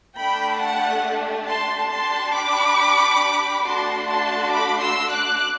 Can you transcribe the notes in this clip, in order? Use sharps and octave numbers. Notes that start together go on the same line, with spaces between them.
A3 D4 G4 G5 B5
F#5 A5
A5 C6
D4 G4 A5 C6
B5 D6
A3 D4 F#4 A5 C6
A5 C6
B5 D6
C6 E6
D6 F#6